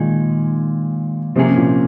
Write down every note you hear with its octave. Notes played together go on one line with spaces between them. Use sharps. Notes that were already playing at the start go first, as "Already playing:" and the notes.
Already playing: A#2 D#3 G#3 D#4 G#4
C3 F3 A#3 C#4 G#4
A#2